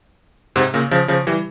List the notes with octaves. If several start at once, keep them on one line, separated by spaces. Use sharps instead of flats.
G#2 C3
A#2 C#3
C#3 F3
C#3 F3
E3 G3